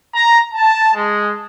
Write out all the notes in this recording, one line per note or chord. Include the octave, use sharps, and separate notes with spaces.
A#5
A5
G#3